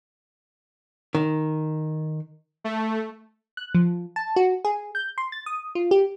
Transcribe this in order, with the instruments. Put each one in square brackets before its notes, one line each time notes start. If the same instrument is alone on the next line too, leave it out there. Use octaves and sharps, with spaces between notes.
[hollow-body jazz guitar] D#3
[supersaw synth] A3
[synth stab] F#6
F3
A5
F#4
G#4
G6
C6
A6
D#6
F4
G4